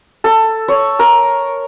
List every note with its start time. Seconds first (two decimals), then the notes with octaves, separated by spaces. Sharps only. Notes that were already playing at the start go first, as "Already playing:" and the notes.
0.24 A4
0.68 C#5
0.99 A#4